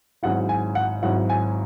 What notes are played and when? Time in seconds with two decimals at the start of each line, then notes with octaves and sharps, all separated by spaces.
0.23 G#1 G#2 F#3 E4 F#5
0.49 G#5
0.75 F#5
1.03 G#1 G#2 F#3 E4 F#5
1.30 G#5